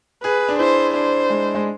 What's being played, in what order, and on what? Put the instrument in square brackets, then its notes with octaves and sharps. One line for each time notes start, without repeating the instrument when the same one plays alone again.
[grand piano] G#4 [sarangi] B4
[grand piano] D4
[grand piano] E4 [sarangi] C5
[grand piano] D4 [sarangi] C5
[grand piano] G#3
G#3